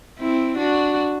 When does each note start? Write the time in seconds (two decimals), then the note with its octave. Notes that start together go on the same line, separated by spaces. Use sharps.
0.20 C4 E4
0.57 D4 F#4